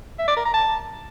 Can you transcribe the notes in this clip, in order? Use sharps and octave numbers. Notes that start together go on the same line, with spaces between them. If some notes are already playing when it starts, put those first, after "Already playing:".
E5
D5
A#4
A#5
A5